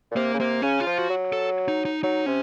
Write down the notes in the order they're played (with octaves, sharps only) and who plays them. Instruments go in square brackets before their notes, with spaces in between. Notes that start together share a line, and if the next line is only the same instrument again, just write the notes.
[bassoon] A#2
[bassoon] C3 [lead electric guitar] A#3
[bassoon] C#3
[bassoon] C3 [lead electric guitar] A#3
[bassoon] C#3 [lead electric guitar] C#4
[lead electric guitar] F4
[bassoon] F3
[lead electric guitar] F#4
[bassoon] F#3
[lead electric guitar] A4
D#4
D#4
[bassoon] F#3 [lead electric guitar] D#4
[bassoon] C3 [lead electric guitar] C#4